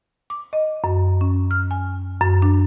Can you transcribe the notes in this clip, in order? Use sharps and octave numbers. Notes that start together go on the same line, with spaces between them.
D6
D#5
F#2
C#4
F6
G#5
F#2
D4